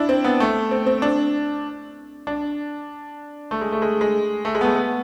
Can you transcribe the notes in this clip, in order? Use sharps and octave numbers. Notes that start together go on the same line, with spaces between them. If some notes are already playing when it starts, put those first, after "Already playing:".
Already playing: D4 E4
C4
B3
A3
C4
C4
D4
D4
A3
G#3
A3
G#3
G#3
A3
G#3
B3
A3
B3